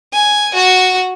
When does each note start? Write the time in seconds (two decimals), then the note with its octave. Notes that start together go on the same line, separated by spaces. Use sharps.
0.13 G#5
0.54 F#4